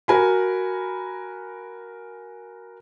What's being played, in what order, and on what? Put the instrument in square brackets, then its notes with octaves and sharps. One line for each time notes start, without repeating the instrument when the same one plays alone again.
[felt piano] F#4 A#4 G#5 B5